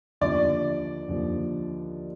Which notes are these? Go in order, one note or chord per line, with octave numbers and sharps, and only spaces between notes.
D#2 D3 F3 D5
D#2 D3 F3